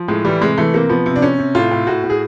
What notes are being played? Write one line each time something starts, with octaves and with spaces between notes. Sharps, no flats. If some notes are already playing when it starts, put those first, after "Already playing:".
Already playing: F3
A2 G#3
E3 G3
C3 G#3
E3 A3
C3 A#3
F3 B3
C3
D4
C3 C#4
C3
A2 F4
A2
A2 F#4
A2
G#4